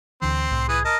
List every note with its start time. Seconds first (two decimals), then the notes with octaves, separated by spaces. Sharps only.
0.22 D2 D3 E3 C4 C6
0.51 C2 A2
0.69 E3 G#4 B4 D#6
0.85 A#4 D#5 A5